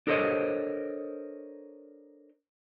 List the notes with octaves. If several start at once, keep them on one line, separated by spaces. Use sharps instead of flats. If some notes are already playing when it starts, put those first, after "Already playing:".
D4 A4 A#4 C5 C#5 D#5